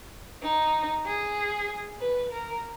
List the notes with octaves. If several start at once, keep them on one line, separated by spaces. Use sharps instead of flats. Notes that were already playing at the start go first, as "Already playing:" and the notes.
D#4
G#4
B4
A#4